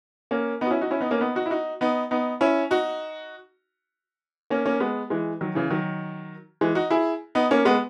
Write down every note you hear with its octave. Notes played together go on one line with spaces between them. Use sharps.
A#3 C#4
B3 D#4
F#4
C#4 E4
D#4 F#4
C#4 E4
B3 D#4
A#3 C#4
B3 D#4
D#4 F#4
E4
D#4 F#4
B3 D#4
B3 D#4
C#4 E4
D#4 F#4
A#3 C#4
A#3 C#4
G#3 B3
E3 G#3
D#3 F#3
C#3 E3
D#3 F#3
E3 G#3
D#4 F#4
E4 G#4
B3 D#4
A#3 C#4
G#3 B3